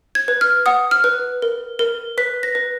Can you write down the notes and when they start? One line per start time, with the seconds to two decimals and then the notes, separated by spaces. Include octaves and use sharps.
0.15 G#6
0.28 B4
0.41 F6
0.66 F#5 D#6
0.91 F6
1.04 B4
1.42 A#4
1.79 A#4
2.18 B4 B6
2.43 A#6
2.55 B4